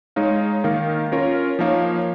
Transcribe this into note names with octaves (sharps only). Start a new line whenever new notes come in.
G#3 D#4 C#5 F5
D#3 A#3 D#4 A#4 F5
C#4 F4 A#4 C#5 F5
F3 A#3 D#4 C#5 F5